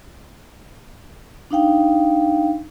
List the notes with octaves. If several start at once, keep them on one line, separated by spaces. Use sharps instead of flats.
D4 D#4 F5 G5